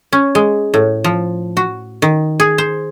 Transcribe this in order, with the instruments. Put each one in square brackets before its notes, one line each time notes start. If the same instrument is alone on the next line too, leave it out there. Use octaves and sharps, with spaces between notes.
[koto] C#4
G#3
A2
F3
F#4
D#3
G#4
C5